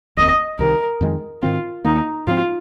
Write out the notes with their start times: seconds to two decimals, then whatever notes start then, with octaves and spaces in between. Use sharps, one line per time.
0.17 F1 D#2 D#3 C4 D#5
0.59 C2 C3 D#3 A#4
1.01 F2 D#3 G#3
1.42 G#2 D#3 C4 F4
1.85 D#2 D#3 A#3 D#4
2.27 G#2 F3 G#3 C4 F4